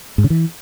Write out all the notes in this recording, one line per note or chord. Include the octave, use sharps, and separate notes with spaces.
G#2
C#3
E3